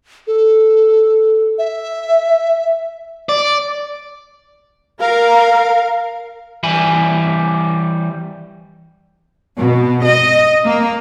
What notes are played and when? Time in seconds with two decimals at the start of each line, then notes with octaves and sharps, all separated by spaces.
0.27 A4
1.58 E5
3.29 D5
5.00 A#4 F5
6.63 E3 G3 E5 G#5 B5
9.58 B2
10.04 D#5
10.65 A#3